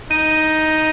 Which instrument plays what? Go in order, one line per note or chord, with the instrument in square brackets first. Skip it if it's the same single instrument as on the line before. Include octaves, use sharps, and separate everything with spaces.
[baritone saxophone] D#4 [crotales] D#7